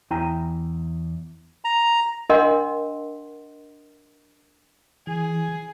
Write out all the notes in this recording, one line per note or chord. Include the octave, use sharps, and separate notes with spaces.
E2 E4 G5 G#5 A#5
A#5
D4 A#4 D#5 F#5 C6
E3 G#4